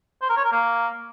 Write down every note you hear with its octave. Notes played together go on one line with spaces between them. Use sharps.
C5
A#4
C#5
A#4
A#3